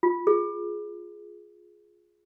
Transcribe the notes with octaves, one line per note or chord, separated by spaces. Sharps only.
F4
G#4